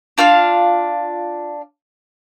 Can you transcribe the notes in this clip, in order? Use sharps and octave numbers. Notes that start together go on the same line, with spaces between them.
D4 F4 F5 F6